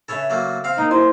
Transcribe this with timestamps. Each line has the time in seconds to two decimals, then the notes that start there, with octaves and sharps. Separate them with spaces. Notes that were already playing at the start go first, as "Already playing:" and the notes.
0.08 C#3 A4 B4 C#5 E5 G#5
0.30 F#3 A3 A#3
0.64 C4 F5
0.78 A#3 D#4
0.91 E4 C5 G#5